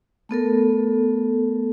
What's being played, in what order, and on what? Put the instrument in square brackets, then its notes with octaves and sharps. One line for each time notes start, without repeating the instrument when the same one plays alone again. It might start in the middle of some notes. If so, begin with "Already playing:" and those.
[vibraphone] A3 B3 A4 A#4